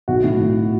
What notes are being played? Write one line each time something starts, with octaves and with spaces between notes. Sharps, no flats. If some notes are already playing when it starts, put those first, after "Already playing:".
B1 F#4
A2
A2